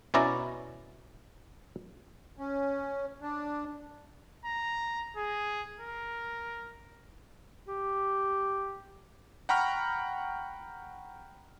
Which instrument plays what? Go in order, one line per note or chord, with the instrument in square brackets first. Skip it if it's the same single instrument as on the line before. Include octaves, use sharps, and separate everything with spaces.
[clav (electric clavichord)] B2 C#4 E4 D5 A#5
[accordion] C#4
D4
[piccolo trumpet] A#5
G#4
A#4
[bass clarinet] G4
[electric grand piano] F#5 G5 A#5 B5 C#6 F6